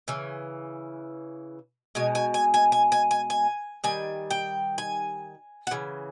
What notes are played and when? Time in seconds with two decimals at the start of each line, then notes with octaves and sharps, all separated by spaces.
0.08 C#3 E3
1.95 B2 G#3 G#5
2.15 G#5
2.34 G#5
2.54 G#5
2.72 G#5
2.92 G#5
3.11 G#5
3.30 G#5
3.84 D#3 G3 G#5
4.30 G5
4.78 G#5
5.67 F#5
5.71 C#3 E3